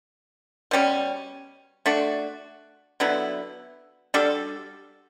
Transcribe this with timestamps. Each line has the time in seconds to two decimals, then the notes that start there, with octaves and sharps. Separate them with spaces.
0.71 B2 G3 C#4
1.86 A3 D4 F#4
3.00 D3 F#3 B3 E4
4.14 G3 D4 F#4 A4